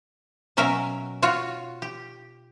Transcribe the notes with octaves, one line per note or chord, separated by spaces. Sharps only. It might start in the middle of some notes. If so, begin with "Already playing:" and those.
B2 F#3 C#4 A#4 E5 F5
F4 F#4 C#5
G4